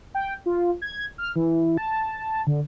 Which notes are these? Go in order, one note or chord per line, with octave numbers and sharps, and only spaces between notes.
G5
F4
G#6
F6
E3
A5
D3